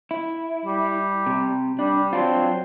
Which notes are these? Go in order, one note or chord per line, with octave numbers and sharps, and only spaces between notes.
E4
G3
C3
G3 D4
F#3 C4 D4 F4